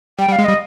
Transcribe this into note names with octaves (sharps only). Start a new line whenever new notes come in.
G3 G5
G3
F5
G#3
G3 D#5